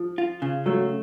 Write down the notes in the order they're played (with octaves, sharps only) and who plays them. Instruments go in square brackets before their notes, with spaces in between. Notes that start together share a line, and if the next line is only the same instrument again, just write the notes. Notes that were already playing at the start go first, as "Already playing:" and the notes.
Already playing: [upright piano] F3
[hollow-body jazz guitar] F4
C#3
[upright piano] F#3 [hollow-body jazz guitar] A3